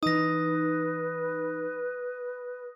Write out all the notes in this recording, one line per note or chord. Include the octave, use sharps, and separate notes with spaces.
E3 D#4 B4 D#6 A#6